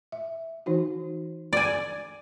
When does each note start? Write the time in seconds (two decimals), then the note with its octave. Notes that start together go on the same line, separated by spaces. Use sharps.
0.12 E5
0.66 E3 D#4 F#4
1.53 D5 G#5